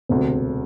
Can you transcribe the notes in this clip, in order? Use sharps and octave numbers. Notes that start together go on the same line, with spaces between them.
E1 D2 C3